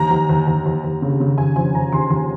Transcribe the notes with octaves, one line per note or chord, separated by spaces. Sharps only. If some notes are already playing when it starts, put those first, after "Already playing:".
Already playing: D#2 A#5
D#2
D#2
D#2
D#2
D#2
C#3
C#3
D#2 G#5
F3 G#5
D#2 A#5
D#2 C6
D#2 C6